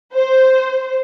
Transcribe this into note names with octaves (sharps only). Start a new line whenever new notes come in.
C5